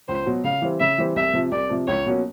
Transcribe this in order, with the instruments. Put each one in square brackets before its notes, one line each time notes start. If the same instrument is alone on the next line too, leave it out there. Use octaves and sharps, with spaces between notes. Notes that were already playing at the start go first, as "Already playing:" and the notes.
[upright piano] C#2 [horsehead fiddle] C5
[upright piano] B2 F#3
[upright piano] C#3 [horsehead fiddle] F5
[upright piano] E3 G3 C4
[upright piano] C#3 [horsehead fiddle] E5
[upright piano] E3 G3 C4
[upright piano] C2 [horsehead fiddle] E5
[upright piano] C3 F3
[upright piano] C2 [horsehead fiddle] D5
[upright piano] C3 F3
[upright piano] C#2 [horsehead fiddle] C#5
[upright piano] B2 F#3 A#3 C#4